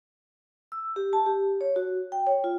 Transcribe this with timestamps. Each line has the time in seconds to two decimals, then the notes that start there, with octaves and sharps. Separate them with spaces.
0.72 E6
0.96 G4
1.13 A5
1.26 G4
1.61 C#5
1.76 F#4
2.12 G5
2.27 C#5
2.44 F4